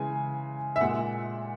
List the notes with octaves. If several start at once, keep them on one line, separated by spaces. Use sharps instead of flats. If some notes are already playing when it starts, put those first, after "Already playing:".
Already playing: C#3 E3 G#3 G#5
E5
A#2 G#3 F#5